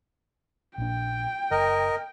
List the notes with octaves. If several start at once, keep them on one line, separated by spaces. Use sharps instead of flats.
A#1 D4 G5
F#1 A#4 D#5